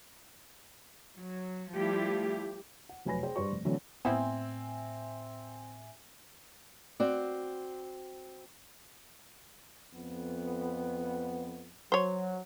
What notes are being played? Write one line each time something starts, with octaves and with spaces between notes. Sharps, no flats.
F#3
F3 G3 A3 E4 G4
F#5
F1 F#3 B4 G#5 B5 A#6
G#4 C5 G5
G2 G4 B4 C5 D5 C#6
F1
D3 E3 F#3 A3 C4
A2 B3 C4 E4 C5 E5 G#5
C4 F#4 D5
F2 B3
F#3 C5 C#5